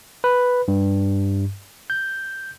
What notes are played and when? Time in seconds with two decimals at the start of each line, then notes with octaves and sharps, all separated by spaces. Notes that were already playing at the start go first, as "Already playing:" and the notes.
0.24 B4
0.68 G2
1.90 G6